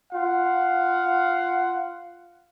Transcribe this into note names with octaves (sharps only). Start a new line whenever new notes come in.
F4 F5 F#5